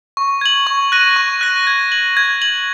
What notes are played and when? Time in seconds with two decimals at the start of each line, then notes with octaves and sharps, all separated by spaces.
0.17 C#6
0.41 G#6 F#7
0.67 C#6
0.92 F#6 A#6 D#7
1.16 C#6
1.41 F#6 A#6 D#7
1.67 G#6
1.92 F#7
2.17 G#6
2.42 F#7